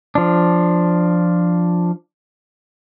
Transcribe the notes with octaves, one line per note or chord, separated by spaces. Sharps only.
F3 D4